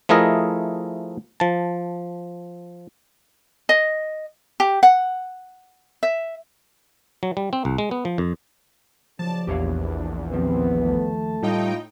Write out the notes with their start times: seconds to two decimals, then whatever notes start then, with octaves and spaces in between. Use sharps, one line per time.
0.09 F3 A3 E4 G#4 A#4 D#5
1.40 F3 A5
3.69 D#5
4.60 G4
4.83 F#5
6.03 E5
7.23 F#3
7.37 G3
7.53 C4
7.65 C2
7.78 G#3
7.91 B3
8.05 F3
8.18 F2
9.19 F#1 C#3 F3 D5 A5
9.47 A#1 E2 B3 D4 G4 C#5 F5
10.32 D#2 F3 B3 C4
10.84 A3 A5
11.43 A2 G3 D#4 F4 G5